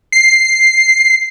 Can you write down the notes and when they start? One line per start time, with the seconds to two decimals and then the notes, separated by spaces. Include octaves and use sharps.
0.12 C7